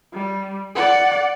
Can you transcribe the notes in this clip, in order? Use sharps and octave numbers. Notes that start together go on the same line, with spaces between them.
G3
D5 F#5